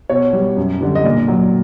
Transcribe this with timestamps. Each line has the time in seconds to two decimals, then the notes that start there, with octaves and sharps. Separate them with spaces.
0.09 B2 C#5
0.33 G3
0.57 F#2
0.81 D3 G3
0.95 D#5
1.04 A#2 D5
1.28 F#3